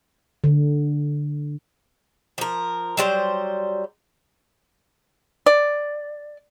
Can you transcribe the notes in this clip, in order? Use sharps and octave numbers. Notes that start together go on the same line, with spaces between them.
D3
F3 A#4
F#3 G3 C5
D5